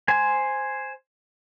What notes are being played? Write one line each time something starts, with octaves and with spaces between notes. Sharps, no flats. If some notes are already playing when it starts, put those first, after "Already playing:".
C5 G#5